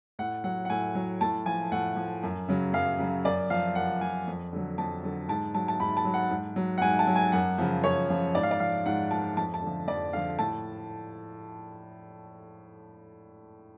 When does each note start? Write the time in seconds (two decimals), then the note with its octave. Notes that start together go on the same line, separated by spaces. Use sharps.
0.19 A2 F#5
0.44 F#3 F#5
0.65 F#5
0.70 A2 G#5
0.95 F#3
1.21 A2 A5
1.46 F3 G#5
1.72 A2 F#5
1.97 F3
2.23 F#2
2.48 C#3 F#3
2.73 F#2 F5
2.99 C#3 F#3
3.25 F#2 D5
3.50 F3 F5
3.75 F#2 F#5
4.01 F3 G#5
4.27 F2
4.53 D3 F#3
4.78 F2 A5
5.03 D3 F#3
5.28 G#2 A5
5.55 F#3 A5
5.68 A5
5.79 G#2 B5
5.97 A5
6.05 F#3
6.14 F#5
6.31 G#2
6.56 F#3
6.78 F#5
6.81 G#2 G#5
6.99 A5
7.07 F#3
7.16 G#5
7.32 F#2 F#5
7.58 C#3 F3
7.84 F#2 C#5
8.10 C#3 F3
8.35 G#2 D5
8.43 F5
8.51 D5
8.60 F3 F5
8.86 G#2 F#5
9.11 F3 A5
9.37 F2 A5
9.54 A5
9.62 D3 F3
9.87 F2 D5
10.13 D3 F5
10.17 F3
10.39 A2 A5